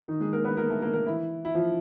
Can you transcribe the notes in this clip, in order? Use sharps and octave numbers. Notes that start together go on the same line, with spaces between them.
D#3 D#4
G#3 G#4
A#3 A#4
B3 B4
A#3 A#4
A3 A4
A#3 A#4
A#3 A#4
E3 E4
E4
F3 F4